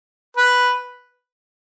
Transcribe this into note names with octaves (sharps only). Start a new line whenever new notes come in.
B4